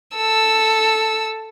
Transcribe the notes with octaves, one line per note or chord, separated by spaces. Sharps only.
A4 E6